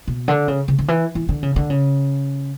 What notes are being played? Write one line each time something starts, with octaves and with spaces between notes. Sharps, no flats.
B2
D3
C#3
C#3
D3
E3
E3
D3
C#3
D3
C#3